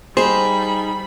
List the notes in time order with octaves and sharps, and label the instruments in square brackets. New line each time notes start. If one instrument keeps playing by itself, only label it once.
[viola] G3 B5 [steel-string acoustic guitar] D#4 G#4 [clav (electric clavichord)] C5